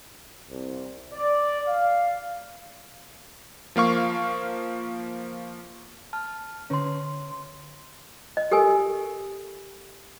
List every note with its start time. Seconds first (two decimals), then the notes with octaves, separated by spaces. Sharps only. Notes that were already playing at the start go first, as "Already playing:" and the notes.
0.49 C2
1.13 D5
1.67 F5
3.76 F3 A#3 F5 C#6
6.13 A5 F6
6.70 D3 C#4 C#5 C6
8.37 D#5
8.51 G4 A4 A#4 G#5